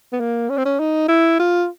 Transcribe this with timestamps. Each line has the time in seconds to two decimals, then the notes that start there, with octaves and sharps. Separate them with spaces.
0.12 B3
0.20 A#3
0.49 C#4
0.57 C4
0.65 C#4
0.79 D#4
1.08 E4
1.39 F4